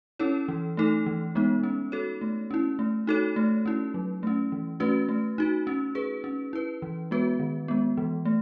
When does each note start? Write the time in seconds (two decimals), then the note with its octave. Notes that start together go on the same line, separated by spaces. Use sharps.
0.19 C#4 E4 A4 C#5
0.48 E3
0.77 A3 D#4 A4
1.06 E3
1.35 G#3 B3 D#4
1.63 C#4
1.92 F#4 A4 C#5
2.21 A3
2.51 C#4 E4
2.79 A3
3.07 D#4 F#4 A4 C#5
3.36 A3
3.66 C#4 E4
3.94 F#3
4.23 A3 C#4
4.52 E3
4.80 A3 C#4 F#4 B4
5.09 A3
5.38 D#4 F#4
5.67 C#4
5.95 G#4 B4
6.24 C#4
6.53 E4 B4
6.82 E3
7.11 G#3 B3 F#4 B4
7.40 D#3
7.68 G#3 B3
7.97 E3
8.25 A3